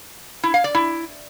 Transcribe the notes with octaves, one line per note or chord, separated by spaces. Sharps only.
E4
F5
D5
E4